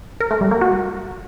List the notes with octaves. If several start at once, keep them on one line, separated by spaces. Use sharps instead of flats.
A#4
A3
G3
A#3
F#4